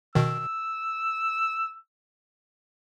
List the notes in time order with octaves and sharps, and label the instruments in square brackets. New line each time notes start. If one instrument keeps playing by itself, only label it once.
[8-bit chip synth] B2 D#3 [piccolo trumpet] E6